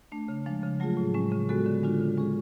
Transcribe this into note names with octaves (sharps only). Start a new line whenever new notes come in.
A3 D4
C#3
F3 G#3 D4
C#3
F#3 A3 F4 G#4
A2
G#3 C#4
C#3
G#3 B3 F#4 A4
D3
G#3 D4 F4
C#3
G#3 C#4 G#4